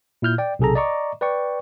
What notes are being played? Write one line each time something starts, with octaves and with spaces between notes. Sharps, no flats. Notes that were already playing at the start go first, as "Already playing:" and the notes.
A#2 E4 F6 G6
D5 G5
B1 C3 G#4 A4 A#5
D5 D#5 A#5 C#6 D6
B4 D5 G5 C#6